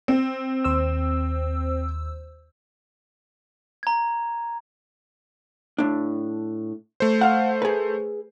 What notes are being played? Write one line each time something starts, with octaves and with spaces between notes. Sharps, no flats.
C4
D#2 C5 E6
A#5 G#6
A2 D4
A3 C5
F5 F#5
G#4 B4